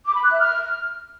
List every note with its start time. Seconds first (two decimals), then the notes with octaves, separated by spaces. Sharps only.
0.05 D6
0.14 B5
0.23 F#6
0.31 E5
0.40 F6